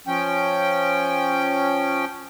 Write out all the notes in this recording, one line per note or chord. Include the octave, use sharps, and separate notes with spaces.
F3 C#4 G5